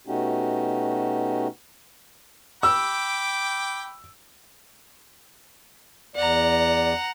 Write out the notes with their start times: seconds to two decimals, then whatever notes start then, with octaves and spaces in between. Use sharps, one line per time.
0.07 B2 A3 C#4 D#4 F#4 G4
2.63 G5 B5 D6 E6
6.16 E2 D5 F#5 A#5